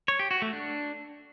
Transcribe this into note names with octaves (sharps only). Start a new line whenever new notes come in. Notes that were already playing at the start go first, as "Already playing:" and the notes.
C#5
G4
F#4
A3
D4